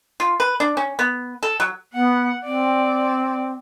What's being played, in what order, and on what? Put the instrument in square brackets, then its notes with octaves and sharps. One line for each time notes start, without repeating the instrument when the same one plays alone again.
[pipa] F4
B4
D4
C#4
B3
A4
F#3
[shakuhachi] B3 [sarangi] F#5
[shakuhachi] C4 [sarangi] D5